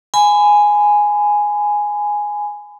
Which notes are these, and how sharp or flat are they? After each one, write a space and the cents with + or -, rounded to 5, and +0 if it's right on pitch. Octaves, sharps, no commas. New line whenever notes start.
G#5 +0 B5 +30